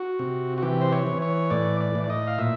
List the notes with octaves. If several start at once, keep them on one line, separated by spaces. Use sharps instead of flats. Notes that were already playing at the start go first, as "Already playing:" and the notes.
Already playing: F#4
C3
F#4
E3 G4
C5
C#5
E3
C#5
A2 D5
D5
A2
D5
D#5
F5
A#2 E5